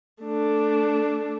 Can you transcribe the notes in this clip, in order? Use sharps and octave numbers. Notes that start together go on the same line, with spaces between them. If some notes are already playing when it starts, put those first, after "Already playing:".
A3 D4